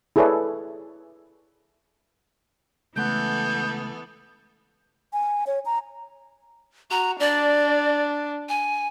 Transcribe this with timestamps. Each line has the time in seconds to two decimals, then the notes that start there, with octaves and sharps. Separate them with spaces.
0.16 E4 G#4 A4 B4 C#5 D5
2.96 C#2 E3 A3 B3 A4 F#5 G6
5.13 G#5
5.47 C#5
5.66 A#5
6.91 F#4 A#5
7.20 D4 D5
8.49 G#5